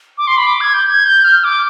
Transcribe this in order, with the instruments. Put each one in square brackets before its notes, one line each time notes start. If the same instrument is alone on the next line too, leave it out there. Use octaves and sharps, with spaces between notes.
[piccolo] D6
C6
B5
D6
G#6
G6
G#6
G6
F6
D6